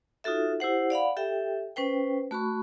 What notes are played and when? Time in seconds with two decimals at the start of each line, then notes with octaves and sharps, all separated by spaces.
0.24 D#4 F4 F#4 A4 E5
0.60 E4 G4 C5 F#5
0.90 D5 F5 F#5 B5
1.17 G4 A4 E5 G5
1.76 C#4 B4 C5 G5
2.31 A3 F#4 B5 C#6